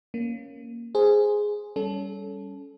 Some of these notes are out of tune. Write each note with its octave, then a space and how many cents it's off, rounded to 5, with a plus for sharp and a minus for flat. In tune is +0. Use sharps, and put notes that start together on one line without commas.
A#3 +0 C#4 +0
G#4 +0 C5 +0
G3 +0 C#4 +15 A4 -20